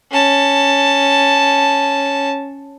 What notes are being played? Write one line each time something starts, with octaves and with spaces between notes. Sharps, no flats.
C#4 A5